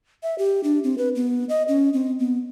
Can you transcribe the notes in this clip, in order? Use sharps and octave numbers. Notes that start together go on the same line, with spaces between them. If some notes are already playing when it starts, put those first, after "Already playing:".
E5
G4
D4
C4
B4
B3
D#5
C#4
C4
B3